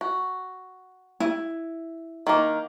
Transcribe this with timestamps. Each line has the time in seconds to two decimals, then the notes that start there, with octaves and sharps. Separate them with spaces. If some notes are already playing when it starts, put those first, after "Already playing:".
0.01 F#4
1.20 E4
2.27 D#3 A#3